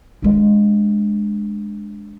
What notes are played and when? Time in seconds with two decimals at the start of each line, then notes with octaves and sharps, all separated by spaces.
0.22 G#3 D4